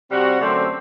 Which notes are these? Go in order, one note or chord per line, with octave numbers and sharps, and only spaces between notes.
C3 G3 C4 F#4
F#2 D3 A3 C4